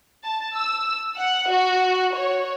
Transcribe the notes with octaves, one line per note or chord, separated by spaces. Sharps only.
A5
E6
F#5
F#4
C#5